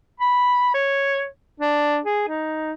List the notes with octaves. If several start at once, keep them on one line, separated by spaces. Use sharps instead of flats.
B5
C#5
D4
G#4
D#4